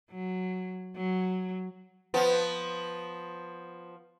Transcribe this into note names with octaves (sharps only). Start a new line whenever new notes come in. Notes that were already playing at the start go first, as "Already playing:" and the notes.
F#3
F#3
F3 B3